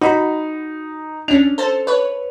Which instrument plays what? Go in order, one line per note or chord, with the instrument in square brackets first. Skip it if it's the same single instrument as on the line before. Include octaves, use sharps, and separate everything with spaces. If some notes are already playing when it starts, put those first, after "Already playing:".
[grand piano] D#4 [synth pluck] F#4 B5
[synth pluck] C#4 D4 [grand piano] F7
[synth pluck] A4 C5 A5
B4 C#5